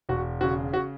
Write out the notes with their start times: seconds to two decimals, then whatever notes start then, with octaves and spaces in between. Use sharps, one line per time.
0.09 E1 F#4
0.41 C#3 F#4
0.73 F#4